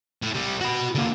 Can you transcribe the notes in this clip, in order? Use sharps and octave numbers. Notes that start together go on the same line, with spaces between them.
A2
C3 G3
F#4 B5
D3 A#3